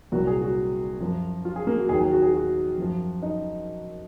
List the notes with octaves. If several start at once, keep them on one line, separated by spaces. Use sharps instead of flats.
C2 A#2 F#3 F#4
G#4
F#4
F#2 F3
F4
G#4
A#3
F#4
D#2 D#3 F#3 G#4
G#4
F#4
G#4
F#4
F#2 F3
D#4